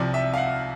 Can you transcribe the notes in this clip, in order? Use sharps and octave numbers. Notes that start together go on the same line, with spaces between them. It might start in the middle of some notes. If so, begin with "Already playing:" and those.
Already playing: C2 C3 F3 D5
E5
F5
F#5